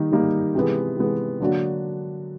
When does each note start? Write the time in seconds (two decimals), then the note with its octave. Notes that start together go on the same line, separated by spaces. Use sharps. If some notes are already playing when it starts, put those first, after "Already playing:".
Already playing: D#3 G3 A#3 D#4
0.11 D#3 G3 A#3 D#4
0.55 C3 E3 G#3 B3
0.97 C3 E3 G#3 B3
1.40 D3 F#3 A#3 D4 F#4